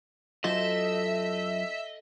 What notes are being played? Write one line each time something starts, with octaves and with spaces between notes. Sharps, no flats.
F#2 A3 F4 C5 D#5 E5